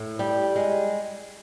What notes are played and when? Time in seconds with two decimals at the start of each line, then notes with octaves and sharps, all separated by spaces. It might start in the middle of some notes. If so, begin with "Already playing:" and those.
Already playing: A2
0.19 G3
0.56 G#3